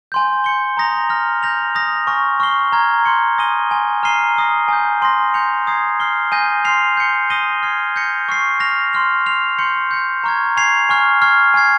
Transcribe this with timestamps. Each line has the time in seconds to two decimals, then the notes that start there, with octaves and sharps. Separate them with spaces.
0.12 G#5 C6 G6
0.44 G6 C#7 G7
0.77 A#5 D#6 A#6 F7
1.09 F6 A#6 F7
1.43 G6 A#6 F7
1.75 D#6 A#6 F7
2.07 G#5 C#6 F6 A#6
2.40 C#6 F6 C7 G7
2.72 A#5 C#6 F6 G#6
3.05 C6 G6 C#7 G7
3.38 G#5 D#6 A#6 D#7 G7
3.71 G#5 C6 D#6
4.03 A#5 F6 C7 D#7 G7
4.37 A#5 D#6 A#6
4.68 G#5 D#6 G6
5.02 G#5 C6 D#6 A#6
5.34 G6 C#7 F7
5.67 A#5 D#6 G#6 C7
6.00 F6 C7 G7
6.32 G#5 D#6 G6 A#6 D#7
6.65 C6 F6 C7 F7
6.97 G6 C#7 G7
7.30 D#6 A#6 D#7 G7
7.63 F6 G#6 C7
7.96 G6 A#6 C#7 F7
8.29 C#6 F6 C7
8.60 F6 A#6 F7
8.93 C6 F6 A#6 F7
9.26 F6 C7 F7
9.59 C6 G6 C#7
9.91 G6 A#6 C#7
10.24 A#5 C#6 F6 G#6
10.57 G#5 C#6 G#6 C7 F7
10.89 G#5 C#6 F6
11.21 C#6 F6 G#6 C7
11.54 G#5 C#6 F6 G#6 C7